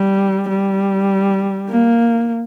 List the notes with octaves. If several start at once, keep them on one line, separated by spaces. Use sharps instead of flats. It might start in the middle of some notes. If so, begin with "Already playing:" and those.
Already playing: G3
G3
A#3